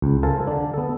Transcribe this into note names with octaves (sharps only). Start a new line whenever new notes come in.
C#2
A4 A#4 C5 F5 G#5 A5
D3 D4
B3 A4